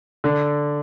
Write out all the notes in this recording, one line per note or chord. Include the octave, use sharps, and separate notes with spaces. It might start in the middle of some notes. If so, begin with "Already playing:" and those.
D3